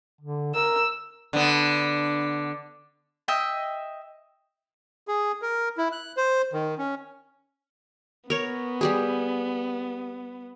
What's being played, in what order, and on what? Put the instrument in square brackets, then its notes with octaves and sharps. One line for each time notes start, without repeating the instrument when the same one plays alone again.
[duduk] D3
[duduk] A#4 [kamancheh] E6
[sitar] D3 B3
[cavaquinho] D#5 E5 G5
[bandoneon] G#4
A#4
E4
F#6
C5
D#3
C#4
[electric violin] B3 [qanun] A#4 C#5
[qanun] G3 G4 G#4